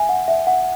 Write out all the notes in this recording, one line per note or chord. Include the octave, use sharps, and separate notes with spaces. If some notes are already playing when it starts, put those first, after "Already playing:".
Already playing: E5 G#5
F#5
E5
F#5